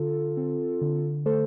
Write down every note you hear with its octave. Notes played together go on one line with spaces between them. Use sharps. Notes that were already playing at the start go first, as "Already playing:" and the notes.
Already playing: D3 F4 A4
C4
D3
A3 A4 C5